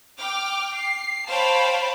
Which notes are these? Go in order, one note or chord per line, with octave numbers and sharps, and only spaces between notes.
G5 D6 F6
C7
C5 C#5 F5 G5 A5 B5